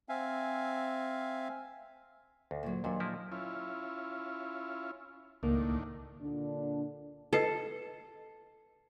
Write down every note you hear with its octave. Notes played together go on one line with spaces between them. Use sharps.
C4 E5 F5 G#5
D2
A#2 F#3
D#2 A#2 F#3 D4
F3 A#3 E4
C#4 E4 F4
C#2 A2 D#3 A#3 D4
A#2 D3 D4
A4 B4 D#5